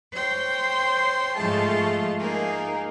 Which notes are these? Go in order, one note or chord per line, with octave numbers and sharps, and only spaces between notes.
C5 C#5 G5 C6
G#2 F3 G#3 A3 F4 A5
A#3 D#4 G#4 A#4